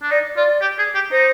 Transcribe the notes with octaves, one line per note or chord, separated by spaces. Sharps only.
D4
D#4 D5
F4 D5
G4
G#4
G4
D#4 C5